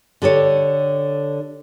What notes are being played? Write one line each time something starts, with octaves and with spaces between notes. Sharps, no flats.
D3 G4 A4 C#5